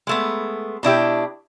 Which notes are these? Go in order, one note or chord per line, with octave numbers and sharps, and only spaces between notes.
G#3 A3 B3
B2 D4 E4 G4